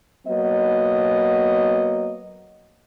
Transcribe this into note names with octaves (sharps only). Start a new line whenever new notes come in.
F#3 A#3 B3 D#5